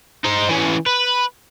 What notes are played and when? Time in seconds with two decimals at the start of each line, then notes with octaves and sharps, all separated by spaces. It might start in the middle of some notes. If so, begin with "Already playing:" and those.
0.24 D#4 C5
0.49 E3 C#4
0.86 B4